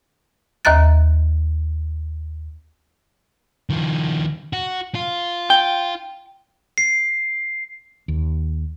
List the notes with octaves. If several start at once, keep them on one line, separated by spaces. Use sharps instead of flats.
D#2 D#5 A#5 F#6 A6
D#3 F3
F#4
F4
G5
C7
D#2